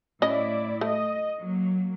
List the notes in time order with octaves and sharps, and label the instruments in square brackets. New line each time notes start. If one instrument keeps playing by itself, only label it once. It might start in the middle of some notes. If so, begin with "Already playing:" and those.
[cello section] A2 E4 D5 [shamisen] C#4 D#5
[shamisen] A3 [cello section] D#5
[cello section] F#3 A#3